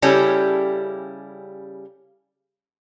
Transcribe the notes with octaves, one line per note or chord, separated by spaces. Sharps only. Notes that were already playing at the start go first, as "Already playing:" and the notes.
C#3 G3 C#4 E4 G4 A4